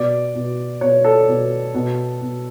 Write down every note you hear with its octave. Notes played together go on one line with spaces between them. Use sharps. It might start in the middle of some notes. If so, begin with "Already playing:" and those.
Already playing: B2 D5
B2
B2 C#5
A4
B2
B2
B2